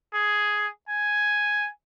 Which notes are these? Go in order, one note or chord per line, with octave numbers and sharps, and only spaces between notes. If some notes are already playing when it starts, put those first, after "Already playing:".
G#4
G#5